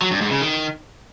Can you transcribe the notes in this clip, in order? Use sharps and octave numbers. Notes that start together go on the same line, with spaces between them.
F#3
G2
G#2
C#3
D#3